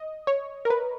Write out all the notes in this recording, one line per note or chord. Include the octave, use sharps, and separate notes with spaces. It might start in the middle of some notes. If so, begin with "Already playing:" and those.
Already playing: D#5
C#5
A#4
B4